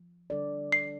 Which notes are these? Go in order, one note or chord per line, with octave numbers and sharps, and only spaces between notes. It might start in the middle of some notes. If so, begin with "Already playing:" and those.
Already playing: F3
D3 G3 D4 A4 D5
C7